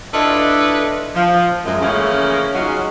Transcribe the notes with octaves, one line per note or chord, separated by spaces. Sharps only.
D4 E4 F4 A4 B4 D#5
F3
F#2 G#3
C#3 E3 F3 A3 A#3 C#4
F#3 G#3 C#4 D#4 F4 F#4